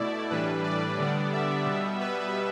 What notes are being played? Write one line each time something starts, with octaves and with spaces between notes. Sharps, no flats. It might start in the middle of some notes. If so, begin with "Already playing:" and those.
Already playing: B2 A3 E4 D5
A2 E3 G3 D4 B4
D5
D3 G3 B3 D4
E5
B2 G3 B3
B4